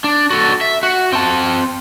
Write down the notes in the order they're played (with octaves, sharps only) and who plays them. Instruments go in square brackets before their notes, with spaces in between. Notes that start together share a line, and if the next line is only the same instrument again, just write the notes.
[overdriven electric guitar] D4
F#4 A4
E5
F#4
C4 A5